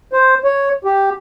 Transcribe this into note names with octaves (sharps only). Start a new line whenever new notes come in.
C5
C#5
G4